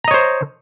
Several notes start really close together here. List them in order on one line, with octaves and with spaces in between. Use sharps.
A#5 D#5 C#5 C5